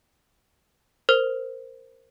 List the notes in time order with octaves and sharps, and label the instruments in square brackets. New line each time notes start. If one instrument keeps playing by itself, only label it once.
[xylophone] A#4 C5 F6